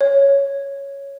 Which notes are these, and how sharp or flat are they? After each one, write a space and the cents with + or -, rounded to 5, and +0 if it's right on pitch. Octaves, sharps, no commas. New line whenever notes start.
C#5 +0